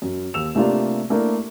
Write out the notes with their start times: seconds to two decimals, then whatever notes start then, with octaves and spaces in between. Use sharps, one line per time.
0.02 F#2
0.34 D#2 E6 E7 F7
0.55 C3 A3 A#3 D4 F4
1.10 A3 A#3 D4 E4 A#4